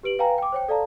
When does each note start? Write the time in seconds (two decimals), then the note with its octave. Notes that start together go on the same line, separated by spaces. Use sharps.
0.03 G4 B4 D7 F#7
0.19 B4 F5 G5 G#5 A#5
0.38 G5 D6
0.52 C5 C#5 G5
0.68 A4 D5 F5 A5 A#5